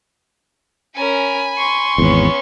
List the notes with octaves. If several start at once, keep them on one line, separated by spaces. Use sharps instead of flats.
C#4 A#4 G#5 B5
C6 C#6
G#1 E2 B3 C#4